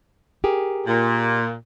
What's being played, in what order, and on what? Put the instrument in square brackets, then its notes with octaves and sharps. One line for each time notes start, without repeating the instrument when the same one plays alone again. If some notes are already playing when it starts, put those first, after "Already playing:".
[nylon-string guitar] G4 G#4 A#4
[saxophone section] A#2